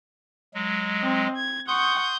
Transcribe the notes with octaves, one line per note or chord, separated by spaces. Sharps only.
F#3 G#3
C4 D#5
G#6
F#5 C6 C#6 D#6 G6